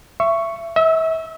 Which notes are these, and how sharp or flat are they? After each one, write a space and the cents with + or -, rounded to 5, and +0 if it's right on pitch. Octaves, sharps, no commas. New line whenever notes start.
E5 +25 C#6 +0
E5 -35 E6 +0